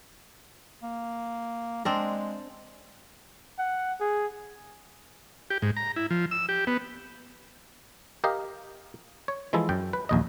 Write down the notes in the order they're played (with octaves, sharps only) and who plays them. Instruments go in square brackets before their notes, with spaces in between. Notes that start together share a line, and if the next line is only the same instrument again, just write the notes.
[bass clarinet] A#3
[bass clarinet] G#3 [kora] C4 D4 A#4
[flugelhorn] F#5
G#4
[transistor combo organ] G4
G#2
A#5
E4
F3
E6
G4
B3
[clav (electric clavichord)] G4 A#4 D#5 F5
C#5
E3 F3 G#3 E4 A4
F#2 G5
B4
A#1 D#2 D#5